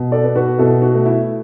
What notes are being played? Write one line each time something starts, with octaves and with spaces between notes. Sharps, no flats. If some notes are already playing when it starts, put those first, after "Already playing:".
Already playing: B2
A4 D5
B3
F#4 B4
B2 E4 A4
F#4
A3
E4